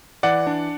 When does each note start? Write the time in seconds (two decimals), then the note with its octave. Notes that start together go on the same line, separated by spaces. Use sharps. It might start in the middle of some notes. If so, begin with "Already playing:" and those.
0.23 E3 D5 F#5
0.47 D4